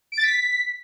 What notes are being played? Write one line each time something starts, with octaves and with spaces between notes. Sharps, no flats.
D7
A6
B6